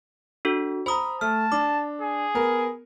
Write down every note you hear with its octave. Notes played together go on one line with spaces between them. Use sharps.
D4 F#4 A4
C5 A#5 B5 D#6
A3 A5 F6
D4 D6
G#4
B3 A#4